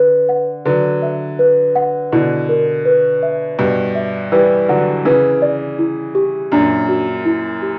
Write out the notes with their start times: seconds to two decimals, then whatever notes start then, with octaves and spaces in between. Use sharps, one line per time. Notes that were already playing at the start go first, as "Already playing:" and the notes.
Already playing: D3 B4
0.29 F#5
0.65 D3 F#3 B4
1.02 E5
1.39 B4
1.76 F#5
2.12 B2 D3 E4
2.49 A#4
2.86 B4
3.23 E5
3.58 G2 B2 B4
3.95 E5
4.32 E3 G3 B4
4.68 D3 F#3 F#5
5.05 C#3 E3 B4
5.42 D5
5.79 E4
6.15 G4
6.52 F#2 A#2 D4
6.89 F#4
7.25 E4
7.62 G4